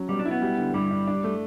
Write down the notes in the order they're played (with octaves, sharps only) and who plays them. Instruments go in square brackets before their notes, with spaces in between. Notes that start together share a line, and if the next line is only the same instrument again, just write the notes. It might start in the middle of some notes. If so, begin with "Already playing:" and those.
Already playing: [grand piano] F#3 C#4
[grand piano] B2 [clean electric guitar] G3
[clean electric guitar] D4
[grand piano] E4
[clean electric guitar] B3
[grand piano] G3
D3
[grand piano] G2 [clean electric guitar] G3
[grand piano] D4
D4
A3